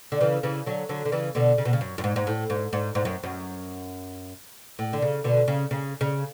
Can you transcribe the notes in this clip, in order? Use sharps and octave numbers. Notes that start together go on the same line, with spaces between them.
D3
C#3 E3
C#3 E3
D3 F#3
D3 F#3
D3
C#3 E3
B2 D3
C#3
B2
C#3
F#2
F#2
G#2
G#2
A2
G#2
G#2
G#2
F#2
F#2
A2
D3
C#3
B2 D3
C#3
C#3
C#3